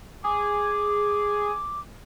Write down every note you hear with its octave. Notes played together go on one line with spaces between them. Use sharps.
G#4 D6